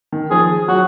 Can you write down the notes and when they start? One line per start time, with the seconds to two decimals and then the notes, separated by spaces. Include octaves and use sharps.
0.12 D#3
0.31 F3 G#4
0.68 F#3 F#4